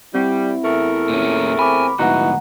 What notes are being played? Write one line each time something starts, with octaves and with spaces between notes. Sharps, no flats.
G3 C4 E4
E2 A3 A#4
A#2 C#4
C4 G#5 B5 D6
D2 G#2 B3 D#4 E4 F#4 F#5 A#5